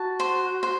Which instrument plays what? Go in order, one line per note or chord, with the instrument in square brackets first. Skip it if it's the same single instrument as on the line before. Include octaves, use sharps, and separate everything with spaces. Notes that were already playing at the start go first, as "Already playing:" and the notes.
Already playing: [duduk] F#4 [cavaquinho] A5
[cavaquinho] C5
C5